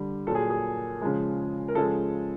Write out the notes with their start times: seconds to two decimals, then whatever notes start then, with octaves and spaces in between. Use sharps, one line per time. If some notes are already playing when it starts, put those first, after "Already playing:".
Already playing: D3 G3
0.27 A#2 F#3 A4
0.35 G#4
0.50 G#4
1.01 C#3 F3 G#3
1.68 A#4
1.75 C#3 F3 G#3 A4